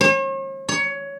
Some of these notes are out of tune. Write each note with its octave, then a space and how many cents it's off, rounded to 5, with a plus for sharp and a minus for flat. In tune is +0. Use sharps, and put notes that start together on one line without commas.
C#5 -45
C#5 +15